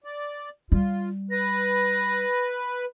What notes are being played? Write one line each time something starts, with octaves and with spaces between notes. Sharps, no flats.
D5
G3 F4
B4 A#6